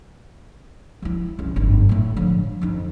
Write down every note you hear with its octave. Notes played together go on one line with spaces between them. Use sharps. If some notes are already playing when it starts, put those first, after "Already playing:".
F3 E4
C2 C#3
G1 F#2
A2 A3
D3 F3
F2 D#4